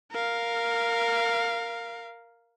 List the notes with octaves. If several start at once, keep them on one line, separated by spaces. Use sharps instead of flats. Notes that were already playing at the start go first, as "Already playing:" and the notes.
A#4 F5